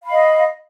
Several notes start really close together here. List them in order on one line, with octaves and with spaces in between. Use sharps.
F5 B5 D#5